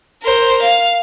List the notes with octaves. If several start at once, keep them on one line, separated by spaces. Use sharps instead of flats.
A#4 C5
F5